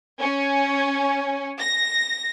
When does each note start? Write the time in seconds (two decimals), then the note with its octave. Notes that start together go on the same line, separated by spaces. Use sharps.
0.21 C#4
1.60 A#6